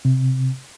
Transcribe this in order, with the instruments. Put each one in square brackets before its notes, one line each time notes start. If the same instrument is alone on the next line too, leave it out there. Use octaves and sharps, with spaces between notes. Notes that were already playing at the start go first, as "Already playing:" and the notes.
[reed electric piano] C3